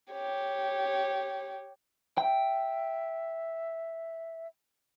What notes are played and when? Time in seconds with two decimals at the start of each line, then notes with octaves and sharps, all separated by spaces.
0.12 G4 C#5
2.18 E5 G5